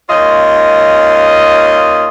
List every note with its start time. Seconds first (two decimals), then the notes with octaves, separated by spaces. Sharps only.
0.09 D#2 C#4 F4 D#5